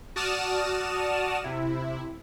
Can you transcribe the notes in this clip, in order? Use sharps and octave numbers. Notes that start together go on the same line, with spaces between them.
F#4 D5 A5 D#6 F6 E7
C3 E4